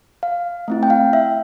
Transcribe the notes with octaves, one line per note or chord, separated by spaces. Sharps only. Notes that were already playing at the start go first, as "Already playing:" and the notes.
F5
A3 C4 E4
G5
F5
E5